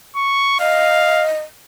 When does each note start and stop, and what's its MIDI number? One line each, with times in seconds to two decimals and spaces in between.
0.16 0.59 85
0.60 1.40 75
0.60 1.25 77